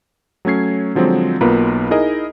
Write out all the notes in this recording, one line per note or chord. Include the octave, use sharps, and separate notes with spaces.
F#3 A3 C#4 G#6 C7
D3 F3 F#3 G#3 C4
B1 A#3 B3 F4 A#4 B4
D#4 E4 G#4 A#4 D#5